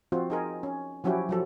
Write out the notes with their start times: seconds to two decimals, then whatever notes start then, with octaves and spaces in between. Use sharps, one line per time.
0.12 F3 C4 F4 F#4
0.30 D#4 G#4 A#4
0.63 C#4
1.04 F3 F#3 C#4 E4 F#4 G4
1.29 F3 F#3 A4